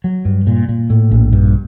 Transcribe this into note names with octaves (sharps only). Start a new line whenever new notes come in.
F#3
G2
A#2
A#2
A2
A#1
G2